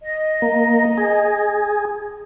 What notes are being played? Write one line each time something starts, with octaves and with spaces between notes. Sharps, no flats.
D#5
A#3
G#4